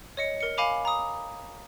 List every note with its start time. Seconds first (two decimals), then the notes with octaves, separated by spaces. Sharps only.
0.17 C#5 D#5 C#7
0.40 A#4 C#7
0.57 F5 G#5 B5 D6 F7
0.85 A#5 D#6